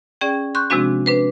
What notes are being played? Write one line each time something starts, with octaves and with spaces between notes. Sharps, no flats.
C#4 G#4 D5 G5
C6 C#6 F#6 G6
C3 F3 G#3 C4 D4 F#4
D4 B4 C5